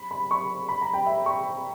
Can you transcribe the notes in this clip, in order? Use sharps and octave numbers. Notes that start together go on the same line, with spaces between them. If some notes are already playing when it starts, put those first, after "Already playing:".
Already playing: B5
B5
C#6
B5
A#5
G5
E5
C#6